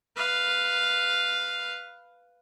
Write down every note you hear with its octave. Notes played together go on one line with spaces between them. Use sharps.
B4 F5